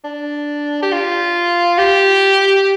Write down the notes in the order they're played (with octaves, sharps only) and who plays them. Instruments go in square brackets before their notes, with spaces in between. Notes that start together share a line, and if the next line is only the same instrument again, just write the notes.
[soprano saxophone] D4
G4
F4
G4